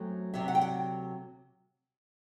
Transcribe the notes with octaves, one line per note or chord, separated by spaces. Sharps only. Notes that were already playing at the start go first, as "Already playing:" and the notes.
Already playing: F#2 F#3 A3 C4
D2 C3 F#3 E5
F#5
G5
F#5